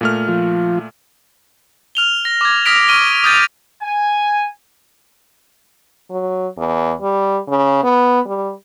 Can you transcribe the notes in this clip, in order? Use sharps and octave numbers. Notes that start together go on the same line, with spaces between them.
A#2 A3 F6
F3 F4
F6 F7 G7
A#6
D6 G#6
D#6 F6 A#6 B6 D7 F7
C#6 F6 D#7 G7
D#6 G6 A6 D#7 F7
G#5
F#3
E2
G3
C#3
B3
G3